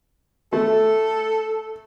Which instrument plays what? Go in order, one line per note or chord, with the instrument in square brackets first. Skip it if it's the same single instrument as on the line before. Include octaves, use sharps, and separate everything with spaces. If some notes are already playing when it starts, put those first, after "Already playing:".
[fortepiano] A3 [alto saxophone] A4